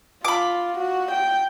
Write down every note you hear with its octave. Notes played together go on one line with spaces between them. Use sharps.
F4 B5 D6
F#4
G5